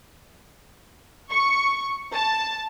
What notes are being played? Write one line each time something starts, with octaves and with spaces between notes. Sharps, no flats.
C#6
A5